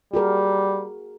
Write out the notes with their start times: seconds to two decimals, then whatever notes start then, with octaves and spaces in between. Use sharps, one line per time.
0.14 G3 F#4 G#4 A#4